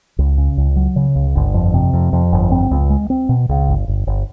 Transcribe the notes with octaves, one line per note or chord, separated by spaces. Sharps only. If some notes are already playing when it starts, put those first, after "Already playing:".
C#2
C#3
C#2
F#3
C#3
C#2
G1
F2
C3
F2
F2
G1
C4
C#2
G#3
C4
B2
C#2
G1
G1
G1